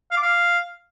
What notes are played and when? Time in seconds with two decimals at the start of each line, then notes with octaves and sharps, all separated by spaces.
0.11 F5
0.17 D6
0.23 F5